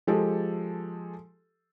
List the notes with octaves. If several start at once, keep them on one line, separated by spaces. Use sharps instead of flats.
F3 G#3 G4 A4